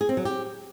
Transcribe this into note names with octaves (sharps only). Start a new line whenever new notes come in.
G#4
C4
F#3
G4